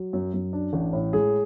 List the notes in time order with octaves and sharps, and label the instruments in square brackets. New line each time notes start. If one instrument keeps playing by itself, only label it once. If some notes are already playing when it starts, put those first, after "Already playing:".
Already playing: [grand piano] F#3
F#2
F#2
D4
A1
A2
G#3 G#4